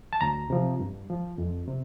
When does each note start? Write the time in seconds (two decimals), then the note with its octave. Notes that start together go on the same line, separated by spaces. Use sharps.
0.13 A5
0.21 D2 A#5
0.50 C3 F3
0.80 G2
1.10 F3
1.38 F2
1.68 C3